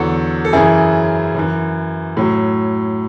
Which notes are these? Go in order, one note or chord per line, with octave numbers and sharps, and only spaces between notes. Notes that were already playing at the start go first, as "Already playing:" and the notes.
Already playing: E2 D3 F#3 F#4 A4
A4
F#2 C#3 E3 E4 G#4
F#2 E3
A2 F#3